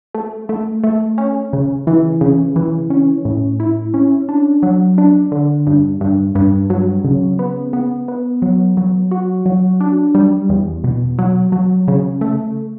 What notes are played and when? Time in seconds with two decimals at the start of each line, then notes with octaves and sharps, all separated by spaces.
0.14 A3
0.49 A3
0.84 A3
1.18 C#4
1.53 C#3
1.87 E3
2.21 C#3
2.56 E3
2.90 C#4
3.25 A2
3.60 E4
3.94 C#4
4.29 D4
4.63 F#3
4.98 D4
5.32 D3
5.67 G2
6.01 G2
6.35 G2
6.70 F#3
7.05 C#3
7.39 B3
7.73 B3
8.08 B3
8.42 F#3
8.77 F#3
9.11 F#4
9.46 F#3
9.81 D4
10.15 G3
10.49 E2
10.84 B2
11.19 F#3
11.52 F#3
11.88 C#3
12.21 A3